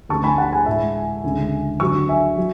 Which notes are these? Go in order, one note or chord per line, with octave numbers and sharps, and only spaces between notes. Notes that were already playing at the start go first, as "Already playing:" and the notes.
D2 D3 A3 A5 C#6
G#5 B5
F#5 A5
G#5 B5
A2 G#3 E5 G#5
D2 C#3 G#3
D2 D3 F#3 C#6 E6
E5 G#5
F#3